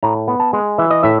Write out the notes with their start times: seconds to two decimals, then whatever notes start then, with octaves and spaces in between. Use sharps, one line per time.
0.03 A2 A#5
0.28 B3
0.40 A5
0.53 G#3
0.78 E3 E5
0.91 D#5
1.03 A2 E5